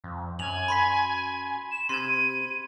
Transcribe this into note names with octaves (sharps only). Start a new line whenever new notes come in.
F2
F#2 G#5 F7 F#7
B5 C6 B6
E7
C3 C6 G#6 D#7